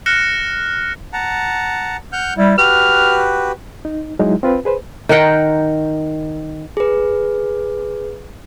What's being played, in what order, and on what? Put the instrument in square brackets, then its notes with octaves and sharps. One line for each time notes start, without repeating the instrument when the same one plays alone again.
[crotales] F6 F#6 A#6 C#7 E7
[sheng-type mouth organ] F#5 A5 A#5
F#5 F6 G6
[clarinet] G3 [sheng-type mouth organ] E4
[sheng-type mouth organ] F#4 G4 B4 [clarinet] F6
[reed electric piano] D#4
F#3 G#3 D#4 E4
C4 F4 B4
G#4 B4 C5
[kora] D#3 A#4 F#5 G5
[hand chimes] G#4 B4